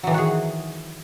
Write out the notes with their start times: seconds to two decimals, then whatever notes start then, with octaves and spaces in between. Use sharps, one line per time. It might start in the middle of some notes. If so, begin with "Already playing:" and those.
0.03 F#3
0.07 E3
0.11 D#3
0.14 F#4
0.18 G#4